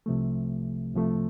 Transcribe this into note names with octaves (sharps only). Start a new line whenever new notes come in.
C2 C3 F3 A3
C2 C3 F3 A3